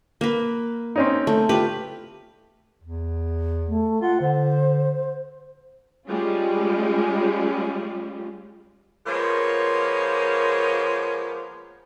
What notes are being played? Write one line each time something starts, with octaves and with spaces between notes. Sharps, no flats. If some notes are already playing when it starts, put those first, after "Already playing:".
A#3 B4
C4 C#4 D#4
A3
F4 G4 B4
E2
A3
F4 F#5
D3 C5
G3 G#3 C#4 F4
F3 G#3 A#3 B3 A#4 C#5